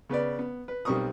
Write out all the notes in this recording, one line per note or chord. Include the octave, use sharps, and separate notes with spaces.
C#3 B3 B4 D5
B3
B4
B1 G3 C4 A#4 C#6 D#6